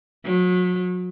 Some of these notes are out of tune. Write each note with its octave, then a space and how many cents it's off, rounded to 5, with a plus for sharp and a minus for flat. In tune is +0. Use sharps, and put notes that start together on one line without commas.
F#3 -35